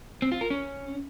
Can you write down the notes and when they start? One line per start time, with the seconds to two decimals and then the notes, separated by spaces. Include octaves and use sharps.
0.22 C4
0.32 F4
0.41 A#4
0.50 C#4